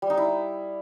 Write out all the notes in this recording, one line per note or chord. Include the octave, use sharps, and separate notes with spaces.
G3
D#4
E4